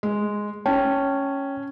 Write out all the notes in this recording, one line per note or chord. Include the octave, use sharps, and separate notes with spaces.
G#3
C#4 C#5 G5 A5